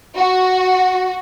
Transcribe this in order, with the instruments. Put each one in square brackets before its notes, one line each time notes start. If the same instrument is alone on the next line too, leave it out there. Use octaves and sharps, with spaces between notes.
[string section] F#4